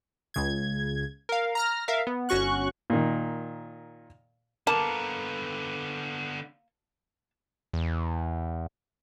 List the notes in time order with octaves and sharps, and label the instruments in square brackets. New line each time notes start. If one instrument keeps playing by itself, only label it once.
[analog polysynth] C#2 C#3 G#6
A#4 F5
A#5 F6 A#6
A#4 E5 F5
B3
G1 C#4 F#4 C#6 F#6
[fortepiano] A#2 D#3
[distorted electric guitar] D3 B3 [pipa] A#3 [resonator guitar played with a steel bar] A5
[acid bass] E2